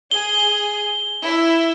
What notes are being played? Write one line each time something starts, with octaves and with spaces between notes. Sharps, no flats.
G#4 G7
E4